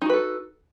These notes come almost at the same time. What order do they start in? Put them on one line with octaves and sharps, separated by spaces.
D#4 F#4 B4 A4